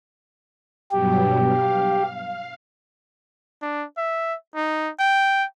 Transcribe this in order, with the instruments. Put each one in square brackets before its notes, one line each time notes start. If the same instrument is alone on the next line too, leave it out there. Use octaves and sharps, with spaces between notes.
[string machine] G2 B2 F#3 [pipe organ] G4
[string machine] F5
[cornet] D4
E5
D#4
G5